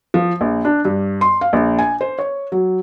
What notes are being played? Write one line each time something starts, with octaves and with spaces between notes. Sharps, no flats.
F3
A#1
D4
G2
C6
F5
A#1
G#5
C5
C#5
F#3